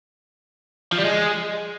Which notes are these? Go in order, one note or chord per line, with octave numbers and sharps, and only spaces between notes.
F3
G3
G#3